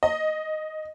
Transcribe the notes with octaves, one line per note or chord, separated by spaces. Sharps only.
D#5